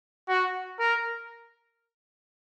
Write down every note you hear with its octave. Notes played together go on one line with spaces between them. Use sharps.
F#4
A#4